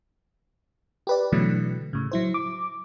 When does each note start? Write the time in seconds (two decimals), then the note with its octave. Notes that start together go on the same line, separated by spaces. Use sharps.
1.07 G4 B4 D5
1.32 B2 D3 E3 F#3 A3
1.93 A2 C#3
2.11 F#3 E4 C5
2.34 D6